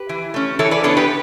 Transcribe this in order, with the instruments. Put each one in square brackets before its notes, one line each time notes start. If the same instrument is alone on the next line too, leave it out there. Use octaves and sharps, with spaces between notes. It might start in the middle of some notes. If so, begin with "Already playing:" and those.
Already playing: [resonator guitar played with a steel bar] G4 B4
E3
A3 C#4
E3 A4 C#5
B4 D5
B3 D4 A4 C#5
G4 B4